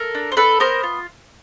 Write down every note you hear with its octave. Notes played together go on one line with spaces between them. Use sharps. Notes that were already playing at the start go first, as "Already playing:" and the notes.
Already playing: A4 A#4
D4
C5
D4 A4 B4
B3 A#4 C5
F4